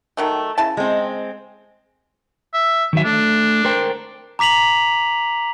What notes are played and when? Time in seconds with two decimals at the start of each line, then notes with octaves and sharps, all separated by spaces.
0.17 D#3 F#3 A3
0.58 C#3 E4 A5
0.77 G#3 C4
2.54 E5
2.93 D#3 F#3 E5
3.05 A3 D4
3.65 A#4 C5 G5
4.39 A#5 D6 B6 F7 F#7